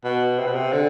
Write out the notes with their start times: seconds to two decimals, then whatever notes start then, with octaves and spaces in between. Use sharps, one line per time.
0.04 B2
0.39 C3
0.47 B2
0.55 C3
0.72 D3